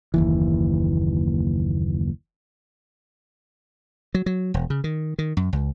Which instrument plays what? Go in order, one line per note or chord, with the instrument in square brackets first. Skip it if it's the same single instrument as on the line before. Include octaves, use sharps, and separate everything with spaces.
[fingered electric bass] F#1 D#2 E3
[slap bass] F#3
F#3
E1
C#3
D#3
D#3
F#2
C#2